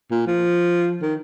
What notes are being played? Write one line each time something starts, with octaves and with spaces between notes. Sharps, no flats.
A#2
F3
D#3